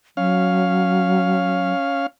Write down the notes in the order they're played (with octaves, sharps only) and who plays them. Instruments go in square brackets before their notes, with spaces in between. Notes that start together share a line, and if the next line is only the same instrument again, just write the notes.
[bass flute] F#3 [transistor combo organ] C#4 F5